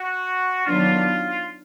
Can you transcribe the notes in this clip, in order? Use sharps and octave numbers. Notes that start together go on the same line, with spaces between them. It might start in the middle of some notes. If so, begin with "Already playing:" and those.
Already playing: F#4
D#3 F#3 B3 D4 F4